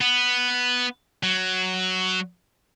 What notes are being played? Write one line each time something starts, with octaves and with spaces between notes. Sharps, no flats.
B3
F#3